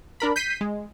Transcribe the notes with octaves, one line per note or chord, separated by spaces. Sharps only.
D4 A#4 B5
G6 B6 C7 D#7
G#3